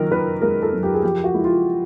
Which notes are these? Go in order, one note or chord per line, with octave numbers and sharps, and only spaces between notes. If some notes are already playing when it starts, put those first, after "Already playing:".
Already playing: F#2 D#3 A#4
D#3 B4
G#3 A#4
A4
F#2
G4
G#4
F3 G4
F#4
G#3 E4
F4